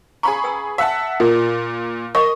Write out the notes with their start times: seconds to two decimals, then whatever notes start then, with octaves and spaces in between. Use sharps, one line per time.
0.23 C#4 G#4 F5 A#5 B5 C#6
0.44 B4 G5 E6
0.78 E5 F#5 A5
1.20 A#2 F4 A#4
2.15 A#4 D#5 C#6